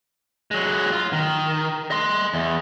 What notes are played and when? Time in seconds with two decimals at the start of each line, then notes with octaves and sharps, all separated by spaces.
0.51 F#3 G#3
0.92 F4
1.12 D#3
1.91 D#5 C6
2.33 E2